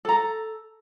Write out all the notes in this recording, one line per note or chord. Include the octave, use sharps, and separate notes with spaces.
A4 A#5